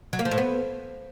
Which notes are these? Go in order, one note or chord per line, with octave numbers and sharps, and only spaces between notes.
F#3
A#3
F3
A2
B3